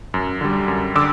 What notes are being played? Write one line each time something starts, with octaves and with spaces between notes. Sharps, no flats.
F#2
D3 G3
F#2
D3 D6 E6